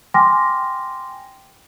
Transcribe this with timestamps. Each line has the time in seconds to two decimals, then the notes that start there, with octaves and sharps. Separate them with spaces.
0.14 G5 G#5 C6 D6 F6 A#6